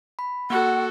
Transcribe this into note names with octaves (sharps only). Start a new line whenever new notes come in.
B5
A#3 F#4 A4 F#5 C#6